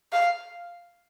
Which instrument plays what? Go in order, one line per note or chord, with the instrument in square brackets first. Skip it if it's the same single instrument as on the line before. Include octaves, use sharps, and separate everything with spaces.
[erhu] F5